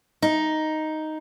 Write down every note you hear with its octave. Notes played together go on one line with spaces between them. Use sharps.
D#4